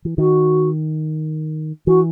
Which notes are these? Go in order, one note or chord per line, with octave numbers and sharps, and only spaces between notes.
E3
D#3 F#4
E3 F#4